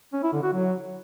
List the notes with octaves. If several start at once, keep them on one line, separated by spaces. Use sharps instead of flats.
C#4
E4
D3
F#4
F#3